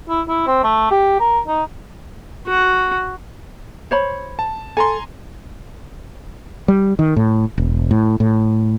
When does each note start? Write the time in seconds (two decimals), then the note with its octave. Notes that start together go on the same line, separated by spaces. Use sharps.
0.09 E4
0.29 E4
0.47 C4
0.64 A3
0.91 G4
1.20 A#4
1.48 D#4
2.48 F#4
3.91 C5 C#5 B5
4.39 A5
4.77 A4 G#5 A#5 C6
6.68 G3
6.99 D#3
7.16 A2
7.58 E1
7.91 A2
8.20 A2